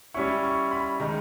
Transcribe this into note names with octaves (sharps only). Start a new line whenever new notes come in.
G3 C#4 E4 C#6
C#6
B5
D#3 G#3 D#4